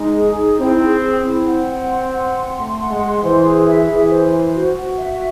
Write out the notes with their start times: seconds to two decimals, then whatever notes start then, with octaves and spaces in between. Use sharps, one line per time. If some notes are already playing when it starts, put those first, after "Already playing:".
Already playing: G#3 D#4
0.15 G#4
0.37 D#4
0.59 C4 E4
0.82 G#4
1.03 G#4
1.25 C4 E4
1.47 F#5
1.69 F#5
1.91 C6
2.13 F#5
2.35 C6
2.56 A3 C6
2.79 F#5
2.89 G#3
3.00 C6
3.22 E3 C5
3.45 G#4
3.66 E5
3.88 E3 G#4
4.10 C5
4.32 C5
4.54 F#4
4.76 F#4
4.98 E5